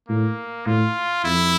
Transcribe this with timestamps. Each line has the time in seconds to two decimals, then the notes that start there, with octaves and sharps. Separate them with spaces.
0.09 A2 A#3
0.66 A2 F4
1.24 F2 E4